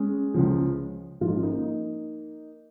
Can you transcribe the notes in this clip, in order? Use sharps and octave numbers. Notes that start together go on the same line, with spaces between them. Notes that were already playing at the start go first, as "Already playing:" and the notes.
Already playing: G#3 C#4
C#2 C#3 F3
G#1 G#2 F3 F4
D#4
C#4
A#3 D#4